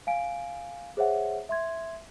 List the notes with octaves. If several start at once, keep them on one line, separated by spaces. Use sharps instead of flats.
F5 G#5 D7
G#4 C5 C#5 E5 F#5
E5 C6 G#6